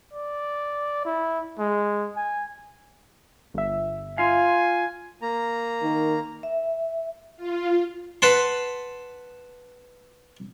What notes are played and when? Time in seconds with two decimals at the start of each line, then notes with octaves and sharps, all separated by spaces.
0.13 D5
1.05 E4
1.59 G#3
2.16 G#5
3.54 G1 E5
4.18 F4 F5 G#5
5.22 A#3 A#5
5.83 D#3
6.43 E5
7.37 F4
8.22 B4 F#5 A5 C6